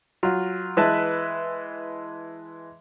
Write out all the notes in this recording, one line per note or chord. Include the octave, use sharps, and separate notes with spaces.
F#3 F4
E3 G#3 B4 E5 A5